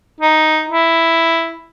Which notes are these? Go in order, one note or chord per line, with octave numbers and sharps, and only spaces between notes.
D#4
E4